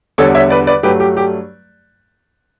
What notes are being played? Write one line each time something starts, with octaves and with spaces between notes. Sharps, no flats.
E2 D3 G3 A4 C#5
C#5 E5
B4 D5
B4 D5
G2 F#3 A3 G4 B4
G4
G4